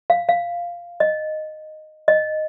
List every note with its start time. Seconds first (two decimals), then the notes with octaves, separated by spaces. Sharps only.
0.10 F5
0.29 F5
1.00 D#5
2.08 D#5